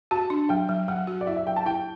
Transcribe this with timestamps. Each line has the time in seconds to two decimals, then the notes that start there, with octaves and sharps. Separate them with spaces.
0.11 F#4 A5
0.30 D4
0.49 F#3 G5
0.69 F#3
0.88 F#3 F#5
1.07 F#4
1.21 D5
1.26 E4 E5
1.37 E5
1.47 F#3 G5
1.56 A5
1.66 E4 G5